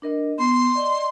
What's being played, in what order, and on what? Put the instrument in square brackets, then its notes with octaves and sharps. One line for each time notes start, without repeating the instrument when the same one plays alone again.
[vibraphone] D4 A#4 D#5
[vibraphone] B3 [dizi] C6
[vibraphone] D5 D#5